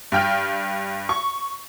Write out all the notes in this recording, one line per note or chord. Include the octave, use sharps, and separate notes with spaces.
G2 G5 F6
C#6